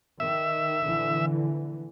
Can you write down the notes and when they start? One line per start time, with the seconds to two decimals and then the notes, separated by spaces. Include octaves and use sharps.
0.20 D#3 E5
0.82 A#1 D3 E3